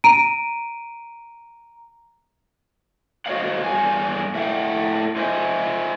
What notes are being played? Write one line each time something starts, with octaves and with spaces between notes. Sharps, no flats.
A#5 D7 D#7
F#4 C5 C#5 D#5 F5 F#5
E2 G2 G#5
A2 E5 F#5 G5
F4 C5 D#5 E5 G#5